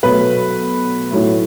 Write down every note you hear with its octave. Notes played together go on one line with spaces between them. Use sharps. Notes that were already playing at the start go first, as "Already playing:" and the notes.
B2 F#3 A3 B4
A2 F#3 A3